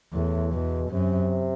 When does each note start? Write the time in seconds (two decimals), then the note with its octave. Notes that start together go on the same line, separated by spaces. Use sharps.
0.13 E2 A2
0.52 E2 B2
0.91 F#2 C3